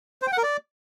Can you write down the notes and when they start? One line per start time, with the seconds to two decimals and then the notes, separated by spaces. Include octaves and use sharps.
0.22 C5
0.27 G5
0.32 F#5
0.38 A#4
0.43 D5